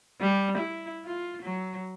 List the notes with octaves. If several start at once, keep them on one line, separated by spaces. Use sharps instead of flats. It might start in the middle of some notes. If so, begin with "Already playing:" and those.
G3
E4
F4
F#3